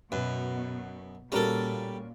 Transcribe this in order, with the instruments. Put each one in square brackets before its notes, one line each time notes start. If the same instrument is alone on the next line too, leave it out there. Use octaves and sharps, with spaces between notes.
[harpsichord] F#2 [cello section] B2 [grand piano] B4
[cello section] A#2 [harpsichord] G3 A4 [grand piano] C#4 F#4 A#4